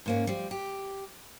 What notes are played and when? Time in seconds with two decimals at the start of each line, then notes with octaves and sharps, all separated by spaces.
0.06 G#2 A#3 C#4
0.27 F3 G3
0.51 G4